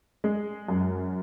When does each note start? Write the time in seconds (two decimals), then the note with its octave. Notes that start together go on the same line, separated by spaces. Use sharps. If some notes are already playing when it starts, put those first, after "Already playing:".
0.24 G#3
0.68 F#2